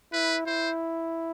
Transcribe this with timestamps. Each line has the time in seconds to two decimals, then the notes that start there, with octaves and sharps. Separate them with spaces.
0.13 E4 B4
0.46 E4 C5